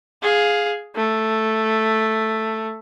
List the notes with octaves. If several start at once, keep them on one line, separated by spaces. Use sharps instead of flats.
G#4 F5
A3